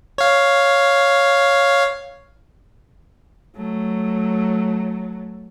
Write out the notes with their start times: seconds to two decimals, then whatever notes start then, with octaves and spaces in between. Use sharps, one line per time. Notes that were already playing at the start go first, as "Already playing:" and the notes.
0.18 C#5 F5
3.56 F#3 A3